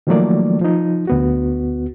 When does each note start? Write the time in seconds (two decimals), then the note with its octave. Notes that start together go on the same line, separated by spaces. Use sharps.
0.07 D#3 F3 F#3 A3 A#3 D5
0.61 F3 D#4
1.07 D2 B3 F#4